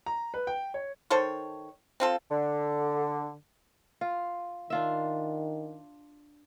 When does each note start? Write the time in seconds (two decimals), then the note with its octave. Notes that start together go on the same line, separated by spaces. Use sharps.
0.06 A#5
0.34 B4
0.47 G5
0.74 C#5
1.10 D#3 A4 C5 C#5
2.00 C4 F4 A4
2.31 D3
4.01 F4
4.70 D#3 D4 F4 E5